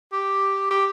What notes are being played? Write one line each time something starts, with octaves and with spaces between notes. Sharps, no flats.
G4
G4